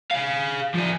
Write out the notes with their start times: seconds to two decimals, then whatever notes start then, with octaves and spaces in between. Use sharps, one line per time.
0.11 G#4 F5
0.74 F3 G#4